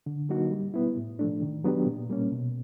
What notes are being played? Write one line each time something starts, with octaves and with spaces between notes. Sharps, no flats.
D3
F#3 A#3 D#4 F#4
G3
B3 E4
A2
F3 A3 D4
D#3
F#3 B3 D4 G4
A#2
G3 A#3 C#4
B2